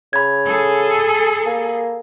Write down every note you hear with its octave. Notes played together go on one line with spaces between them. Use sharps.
C#3 B5 G#6
G#4 A4
A#3